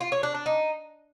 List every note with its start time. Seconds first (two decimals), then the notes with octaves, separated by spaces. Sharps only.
0.01 F4
0.12 C#5
0.23 D4
0.34 D4
0.46 D#4